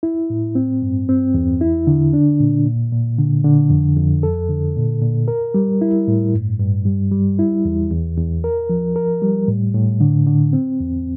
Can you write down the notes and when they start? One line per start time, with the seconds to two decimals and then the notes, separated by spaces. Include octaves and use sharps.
0.03 E4
0.30 A2
0.55 C4
0.82 G2
1.09 C4
1.34 E2
1.61 E4
1.87 D3
2.13 D4
2.40 A#2
2.66 A#2
2.93 A#2
3.19 D3
3.45 D3
3.70 F2
3.96 F2
4.23 A4
4.49 D3
4.76 A#2
5.01 A#2
5.28 A#4
5.54 G3
5.81 E4
6.08 A2
6.34 G2
6.59 G2
6.85 G3
7.12 G3
7.39 E4
7.65 E2
7.91 E2
8.18 E2
8.44 A#4
8.69 F3
8.96 A#4
9.22 G3
9.48 A2
9.74 A2
10.01 D3
10.27 D3
10.53 C4
10.80 E2